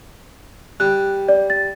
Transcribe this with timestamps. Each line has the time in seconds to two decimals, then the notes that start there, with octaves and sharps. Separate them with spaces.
0.80 G3 F#6
1.29 D5
1.50 A6